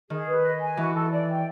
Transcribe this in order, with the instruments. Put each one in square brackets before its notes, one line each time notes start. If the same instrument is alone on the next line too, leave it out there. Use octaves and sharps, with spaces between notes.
[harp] D#3 [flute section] G#4
[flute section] B4
D#5
G#5
[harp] E3 [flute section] F#4
[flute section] A4
D5
G5